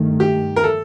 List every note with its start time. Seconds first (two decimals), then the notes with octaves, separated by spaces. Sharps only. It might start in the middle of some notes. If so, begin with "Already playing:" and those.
Already playing: G2 D#3 A3
0.20 G4
0.56 A#4
0.64 A4